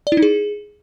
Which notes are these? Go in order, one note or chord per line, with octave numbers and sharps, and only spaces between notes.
D5
E4
D#4
G#4